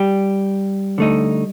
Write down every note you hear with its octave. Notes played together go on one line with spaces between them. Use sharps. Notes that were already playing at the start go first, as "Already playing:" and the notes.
Already playing: G3 G4
D3 A3 D#4